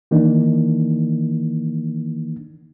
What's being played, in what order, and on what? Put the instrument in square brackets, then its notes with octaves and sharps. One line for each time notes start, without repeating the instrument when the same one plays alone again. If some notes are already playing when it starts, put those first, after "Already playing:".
[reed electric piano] D#3 E3 A#3 D4 D#4